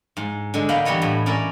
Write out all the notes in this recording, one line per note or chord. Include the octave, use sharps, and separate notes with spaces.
G#2
D3 G#3
A#3 B3 F5 G5 B5
E3 G3 B3 C#5 D#5
A2
C#4 E4 A#4 D5